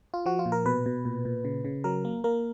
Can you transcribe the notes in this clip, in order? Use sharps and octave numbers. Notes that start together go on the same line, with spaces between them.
F4
F3 F#4
F4
A#2
A#4
B2 B4
B2
A#2
A#2
C#3
C#3
F#3 A#4
A#3
A#3 A#4